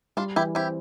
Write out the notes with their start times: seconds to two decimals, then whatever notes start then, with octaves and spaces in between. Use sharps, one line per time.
0.17 G3 D4 F4
0.36 E3 E4 G4
0.55 C4 E4 G4